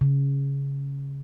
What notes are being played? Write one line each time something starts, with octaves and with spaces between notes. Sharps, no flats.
C#3